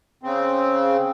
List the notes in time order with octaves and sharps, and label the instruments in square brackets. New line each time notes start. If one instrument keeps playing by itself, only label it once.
[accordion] C#3 C4